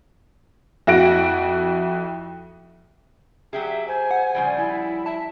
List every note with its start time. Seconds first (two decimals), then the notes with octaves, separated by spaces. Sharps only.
0.87 F2 E4 F#4 A#6 D7
3.53 F#3 G4 G#4 E5
3.88 C5 G#5
4.11 F#5
4.35 C#3 F3 G3
4.58 E4
5.06 E5 A5